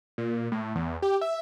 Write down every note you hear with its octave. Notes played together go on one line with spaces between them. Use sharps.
A#2
A2
E2
G4
E5